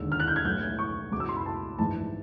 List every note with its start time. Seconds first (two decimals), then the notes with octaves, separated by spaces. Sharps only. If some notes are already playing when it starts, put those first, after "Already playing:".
Already playing: E1 D#2 D3 E6
0.12 F6
0.20 F#6
0.28 G6
0.36 G#6
0.45 B1 A2 E3 G6
0.79 C#6
1.11 C#2 B2 D6
1.20 E6
1.29 C6
1.36 B5
1.46 A5
1.79 A#1 G#2 E3 A5